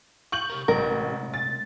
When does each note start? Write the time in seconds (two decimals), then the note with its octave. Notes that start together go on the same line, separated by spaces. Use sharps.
0.32 C#6 G6 F#7
0.50 C3 G4 A#4
0.68 A1 C3 G#3 A3 A#4
1.34 A6